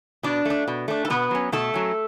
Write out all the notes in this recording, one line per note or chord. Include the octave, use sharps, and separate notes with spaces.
B2 D4 D5
A3 D4
B2
A3 D4
A4
B2 B3 B4
F#3 C#4
B2 A3 A4
F#3 C#4